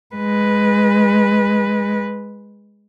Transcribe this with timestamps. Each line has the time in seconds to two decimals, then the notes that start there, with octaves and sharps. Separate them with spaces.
0.16 G#3 B4